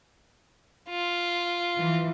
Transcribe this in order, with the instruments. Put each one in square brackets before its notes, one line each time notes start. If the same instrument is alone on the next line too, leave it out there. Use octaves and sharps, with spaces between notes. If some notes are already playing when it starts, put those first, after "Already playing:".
[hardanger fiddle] F4
[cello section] E3 F3